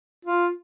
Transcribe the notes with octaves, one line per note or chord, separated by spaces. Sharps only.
F4